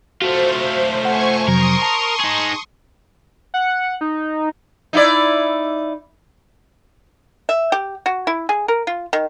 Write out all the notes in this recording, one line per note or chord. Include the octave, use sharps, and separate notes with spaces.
A3 F4 F#4 C5
C5 F#5 G#5 C#6
F2 C3 F#3 A#4 C6 C#6 D#6
A5
D#4 G#4
F#5
D#4
D#4 E4 D5
E5
G4
F#4
E4
G#4
A#4
F4
D#3